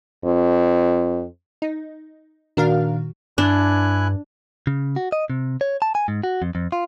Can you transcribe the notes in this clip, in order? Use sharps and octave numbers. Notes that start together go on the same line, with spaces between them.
F2
D#4
A#2 D#3 D4 F#4 A#4 F5
G2 D4 E4 G#5 F#6
C#3
F#4
D#5
C3
C#5
A5
G#5
G#2
F#4
F2
F2
F4